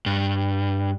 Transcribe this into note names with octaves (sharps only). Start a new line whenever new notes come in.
G2